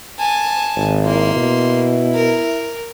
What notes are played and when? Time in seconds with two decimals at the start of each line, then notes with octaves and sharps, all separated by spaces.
0.19 G#5 A5
0.76 G#1
1.05 A#3 E4 C6
1.35 B2
2.15 A#4